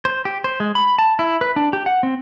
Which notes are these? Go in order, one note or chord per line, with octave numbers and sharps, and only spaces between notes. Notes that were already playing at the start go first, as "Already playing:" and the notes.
C5
G4
C5
G#3
B5
A5
E4
B4
D4
G4
F#5
C4